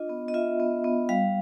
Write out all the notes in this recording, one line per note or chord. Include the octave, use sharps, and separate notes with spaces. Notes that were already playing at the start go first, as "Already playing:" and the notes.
Already playing: D4 F4 D#5
B3
D#5
F4 E5
B3
B3
G3 F5